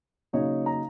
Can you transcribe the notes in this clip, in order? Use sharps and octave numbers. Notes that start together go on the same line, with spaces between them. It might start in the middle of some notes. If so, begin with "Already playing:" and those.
C#3 F#3 A#3 D#4 C#5
A#5